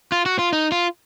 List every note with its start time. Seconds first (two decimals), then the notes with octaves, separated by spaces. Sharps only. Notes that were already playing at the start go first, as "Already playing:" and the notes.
0.12 F4
0.26 F#4
0.39 F4
0.53 D#4
0.72 F4